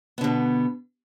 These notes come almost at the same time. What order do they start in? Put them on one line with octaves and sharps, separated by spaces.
B3 D3 B2